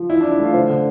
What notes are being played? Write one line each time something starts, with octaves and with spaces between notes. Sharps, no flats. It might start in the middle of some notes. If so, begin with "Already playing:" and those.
Already playing: F3
E3 E4
D4
E3
E4
A3 F4
D3 C5
D3